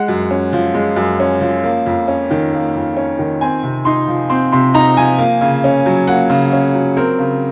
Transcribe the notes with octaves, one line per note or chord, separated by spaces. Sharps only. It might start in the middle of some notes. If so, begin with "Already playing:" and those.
Already playing: G#3 F#5
F#2
C#4
F3
G#3
F#2
C#4
F3
A#3
F2
C#4
D#3
A#3
F2
C#4
D#3
C4 G#5
C3
D#4 C6
F3
C4 C6
C3 C6
D#4 A#5
F3 G#5
A#3
C#3
C#4
F#3
A#3 F#5
C#3
C#4
F#3
C4 A#4
C#3